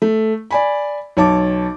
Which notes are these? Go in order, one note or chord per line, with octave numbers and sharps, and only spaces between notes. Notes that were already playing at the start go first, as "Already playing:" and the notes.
A3
D5 G#5 B5
B1 C#5 A5 D6